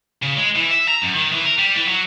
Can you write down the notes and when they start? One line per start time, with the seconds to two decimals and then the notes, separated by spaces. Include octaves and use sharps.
0.23 C#3
0.37 G#3
0.56 E3
0.71 E5
0.88 A#5
1.02 F#2
1.14 D#3
1.32 E3
1.45 A#4
1.58 G3
1.75 E3
1.88 F#3